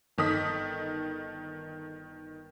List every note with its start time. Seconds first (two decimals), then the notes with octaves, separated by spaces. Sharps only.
0.18 G1 D#3 A4 D#6 B6